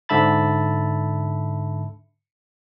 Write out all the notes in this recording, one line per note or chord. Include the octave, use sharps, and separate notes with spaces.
G#2 D3 E5 A5 B5 A6